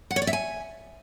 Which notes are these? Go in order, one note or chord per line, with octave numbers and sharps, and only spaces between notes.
F#5
C#5
D5
E5
G#5